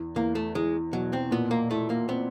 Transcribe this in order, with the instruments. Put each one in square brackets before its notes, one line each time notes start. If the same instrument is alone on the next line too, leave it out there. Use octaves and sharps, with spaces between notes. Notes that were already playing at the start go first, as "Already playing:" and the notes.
Already playing: [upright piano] E2
[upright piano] E2 [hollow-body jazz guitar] A#3
[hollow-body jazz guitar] A3
[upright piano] E2 [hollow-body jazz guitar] G#3
[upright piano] B2 [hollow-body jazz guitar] F#3
[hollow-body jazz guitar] C4
[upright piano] A#2 [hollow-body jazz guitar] B3
[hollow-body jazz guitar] A#3
[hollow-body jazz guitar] A3 [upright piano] E4
[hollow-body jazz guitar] A#3
[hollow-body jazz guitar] B3 [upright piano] C4